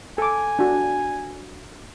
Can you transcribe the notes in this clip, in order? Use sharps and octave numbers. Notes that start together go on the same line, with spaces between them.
A4 G#5 D6
D4 F#4